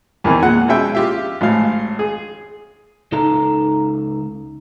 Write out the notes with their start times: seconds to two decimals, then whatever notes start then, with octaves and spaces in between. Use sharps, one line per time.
0.24 E2 D#3 E3 C4
0.42 A#2 G#3 F#5
0.68 B2 G#3 C#4 E5 G5
0.95 F4 G4 E5
1.41 G#1 A2 F5
1.99 G#4
3.12 C#2 D#4 A4 F5 A#5